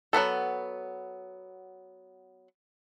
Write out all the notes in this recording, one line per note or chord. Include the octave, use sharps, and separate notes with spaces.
F#3 A3 B3 A4